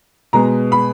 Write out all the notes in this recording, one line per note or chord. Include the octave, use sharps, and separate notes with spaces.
B2 G#3 B3 A#5
B5